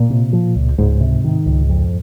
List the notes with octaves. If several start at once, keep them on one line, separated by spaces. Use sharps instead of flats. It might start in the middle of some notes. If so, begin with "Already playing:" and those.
Already playing: A#2
C3
F3
C#2
C#2 G#2
C3
D#3
C#2
F2